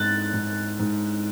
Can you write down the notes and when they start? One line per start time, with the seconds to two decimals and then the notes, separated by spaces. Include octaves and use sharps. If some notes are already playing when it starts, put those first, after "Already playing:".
Already playing: G#2 F#6 A6
0.33 G#2
0.79 G#2